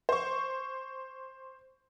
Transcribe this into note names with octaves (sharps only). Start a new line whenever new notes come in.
C5 C#6